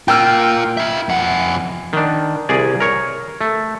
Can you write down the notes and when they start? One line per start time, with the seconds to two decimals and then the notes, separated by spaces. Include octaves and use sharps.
0.08 F4 A#4 G5 E6 F6
0.77 F4 E5
1.09 F2 F#5
1.93 D#3 D4
2.49 C2 G#4 D5 G#5
2.80 A#4 C#5
3.41 A3